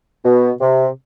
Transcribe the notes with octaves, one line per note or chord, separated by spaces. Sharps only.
B2
C3